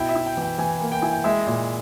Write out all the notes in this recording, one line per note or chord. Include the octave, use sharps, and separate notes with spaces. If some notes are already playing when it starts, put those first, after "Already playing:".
Already playing: B2 E4 G5
E5
E4
G5
E3
G5
E3 G#5
A#3
G5
E4 G#5
G5
G#3 E5
A#2